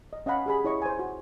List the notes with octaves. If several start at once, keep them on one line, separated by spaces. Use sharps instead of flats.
D#5
C#4 D#5 F5 F#5 B5
G4 G#4 B5
E4 C#5 D#5 C#6
C5 G#5
F#4